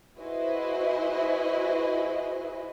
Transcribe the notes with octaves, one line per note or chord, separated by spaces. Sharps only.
E4 F#4 G#4 B4 C5 D#5